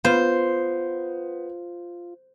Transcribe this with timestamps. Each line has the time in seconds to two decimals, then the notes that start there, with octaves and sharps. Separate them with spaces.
0.05 B3 F4 C5